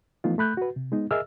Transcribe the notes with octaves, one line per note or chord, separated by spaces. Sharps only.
E3 F3 A3 B3 D#4 F4
A3 B5 F#6 G6
F#4 B4
C3
G#3 B3 D#4
G#4 A#4 D#5 E5 E6 F6